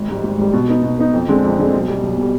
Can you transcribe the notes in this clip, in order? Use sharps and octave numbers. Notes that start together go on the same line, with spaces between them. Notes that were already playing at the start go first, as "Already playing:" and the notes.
Already playing: G#1
G#2 G3
G#1
G#2 G3
B2
B3 D#4
B2
B3 D#4
F2
D3 G#3 C4
F2
D3 G#3 C4
B1
B2 G3
B1
B2 G3